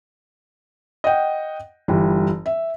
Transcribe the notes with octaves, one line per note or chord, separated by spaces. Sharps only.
D#5 F#5 G5
G1 E3 G3
E5